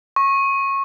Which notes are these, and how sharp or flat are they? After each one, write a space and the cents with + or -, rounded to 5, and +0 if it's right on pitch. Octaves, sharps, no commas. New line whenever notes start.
C#6 -20